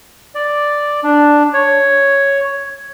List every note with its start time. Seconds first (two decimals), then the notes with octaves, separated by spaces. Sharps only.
0.35 D5
1.03 D4
1.54 C#5